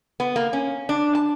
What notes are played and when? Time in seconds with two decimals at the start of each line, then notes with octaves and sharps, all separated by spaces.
0.20 B3
0.36 A#3
0.53 C#4
0.89 D4
1.15 A5